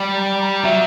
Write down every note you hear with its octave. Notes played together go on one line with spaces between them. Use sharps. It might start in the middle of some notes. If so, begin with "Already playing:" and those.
Already playing: G3
A#5
A#5
F#3 E5